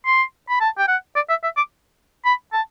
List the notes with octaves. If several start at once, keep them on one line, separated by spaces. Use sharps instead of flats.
C6
B5
A5
G5
F#5
D5
E5
E5
D6
B5
A5